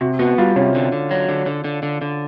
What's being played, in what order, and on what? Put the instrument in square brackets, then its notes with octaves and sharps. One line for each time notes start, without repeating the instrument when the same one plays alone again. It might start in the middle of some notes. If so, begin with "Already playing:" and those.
[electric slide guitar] C3 [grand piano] F#4
[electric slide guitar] B3 [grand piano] F#4
[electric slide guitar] G3 [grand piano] F4
[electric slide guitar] C3 [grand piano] C#4
[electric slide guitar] D3
D3
F#3
D3
D3
D3
D3
D3